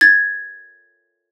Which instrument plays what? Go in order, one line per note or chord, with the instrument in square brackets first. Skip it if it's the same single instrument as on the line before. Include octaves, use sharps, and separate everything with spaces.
[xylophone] G#6 A6